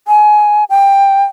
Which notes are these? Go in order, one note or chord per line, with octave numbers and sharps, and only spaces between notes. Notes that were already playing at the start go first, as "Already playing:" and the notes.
G#5
G5